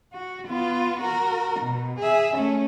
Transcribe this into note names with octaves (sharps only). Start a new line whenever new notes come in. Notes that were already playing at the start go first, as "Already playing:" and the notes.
F#4
B3 F4
F#4 A#4
B2
G#4 E5
A3 C#4